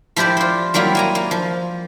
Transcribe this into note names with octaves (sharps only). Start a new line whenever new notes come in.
F3 E4 G4 C5 D5
F4 C5
F#3 G3 A#3 E4 F4
A#3 G#5 A#5
A#3
F3